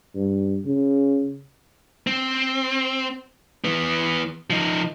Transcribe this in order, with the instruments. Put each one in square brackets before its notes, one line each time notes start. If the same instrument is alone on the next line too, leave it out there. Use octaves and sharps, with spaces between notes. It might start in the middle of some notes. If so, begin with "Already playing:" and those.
[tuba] G2
C#3
[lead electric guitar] C4
E3 B3
F3 D#4